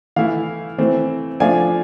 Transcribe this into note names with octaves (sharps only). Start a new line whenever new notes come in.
E3 A3 E4 F5
E3 A3 C4
F3 A3 D4 F4 G#5